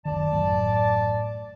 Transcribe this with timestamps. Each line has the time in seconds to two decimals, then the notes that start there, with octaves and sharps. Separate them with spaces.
0.05 F#1 D2 D#3 D5 A5
0.32 A1 F#2 A2